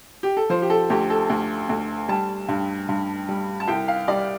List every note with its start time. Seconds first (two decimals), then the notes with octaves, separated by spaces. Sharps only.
0.23 G4
0.37 A4
0.50 F3 C5
0.62 G4
0.70 A4
0.90 D2 G4
1.10 A4
1.30 D2
1.69 D2
2.09 G3 A5
2.48 G2
2.89 G2
3.29 G3
3.60 A5
3.68 C2 G5
3.88 F5
4.08 G3 D5